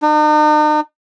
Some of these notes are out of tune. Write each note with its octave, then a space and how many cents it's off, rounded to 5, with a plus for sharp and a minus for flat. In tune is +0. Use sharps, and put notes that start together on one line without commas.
D#4 -45